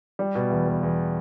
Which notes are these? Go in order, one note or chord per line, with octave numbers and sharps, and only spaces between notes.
G3
B2
E2
E2
E2